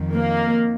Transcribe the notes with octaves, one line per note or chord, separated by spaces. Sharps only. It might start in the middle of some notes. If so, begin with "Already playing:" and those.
Already playing: F2 D#3
A#3